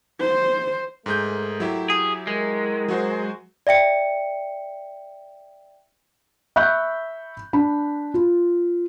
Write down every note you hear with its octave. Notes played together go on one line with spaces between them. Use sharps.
C5
G#2 A3 G#4 A#4 G6
F#3 E4 G4
G#4
G#3 A#4
F#3 F#4 C5
D5 E5 G5 C#7
E5 B5 C#6 F#6 G6
D4 B5
F4